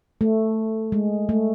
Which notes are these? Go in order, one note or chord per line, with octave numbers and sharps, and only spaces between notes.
A3
G#3
A3